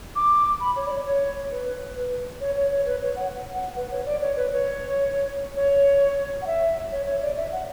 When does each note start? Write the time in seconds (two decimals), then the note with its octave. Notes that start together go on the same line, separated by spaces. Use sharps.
0.16 D6
0.60 B5
0.76 C#5
0.87 D5
0.91 C#5
1.06 C#5
1.51 B4
2.41 C#5
2.56 C#5
2.71 C#5
2.86 B4
3.01 C#5
3.16 F#5
3.54 F#5
3.76 B4
3.91 C#5
4.06 D5
4.21 C#5
4.36 B4
4.51 C#5
5.56 C#5
6.42 F#5
6.47 E5
6.92 C#5
7.06 C#5
7.22 D5
7.37 E5
7.52 F#5